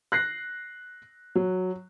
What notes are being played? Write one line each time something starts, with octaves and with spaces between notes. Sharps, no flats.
F#6 A#6 C7
F#3